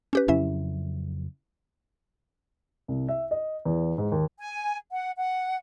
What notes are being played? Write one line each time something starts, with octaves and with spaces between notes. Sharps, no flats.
C#4 G4 B4
F2 C#3 F#3 C#4 E4 E5
C2
E5
D#5
E2
G#2
D#2
G#5
F#5
F#5